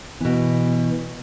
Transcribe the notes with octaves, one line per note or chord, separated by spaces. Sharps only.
B2 E3 B3